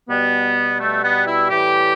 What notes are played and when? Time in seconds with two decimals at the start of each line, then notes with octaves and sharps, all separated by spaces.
0.10 B2 G3 B3
0.79 A3
1.03 B3
1.27 E4
1.50 A2 E3 G3 G4